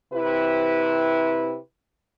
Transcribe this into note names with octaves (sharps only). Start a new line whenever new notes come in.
C3 E4 B4